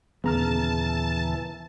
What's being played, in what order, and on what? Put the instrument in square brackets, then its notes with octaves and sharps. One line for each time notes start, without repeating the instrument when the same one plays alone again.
[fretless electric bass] D#2 A#2 B3 [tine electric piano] C#3 A#5 F6 [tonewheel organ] E3 [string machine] A5